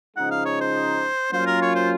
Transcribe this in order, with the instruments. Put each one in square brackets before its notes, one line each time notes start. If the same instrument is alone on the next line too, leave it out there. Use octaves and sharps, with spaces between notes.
[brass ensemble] C#3 F3 G#3 D#4 [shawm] F#5
[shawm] F5
C#5
C5
[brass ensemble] F#3 A#3 C#4 F4 [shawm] C5
[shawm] A#4
C#5
C5